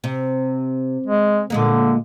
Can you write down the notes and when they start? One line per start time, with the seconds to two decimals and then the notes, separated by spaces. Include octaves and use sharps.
0.04 C3
1.06 G#3
1.50 A#2 D3 G#3 A#3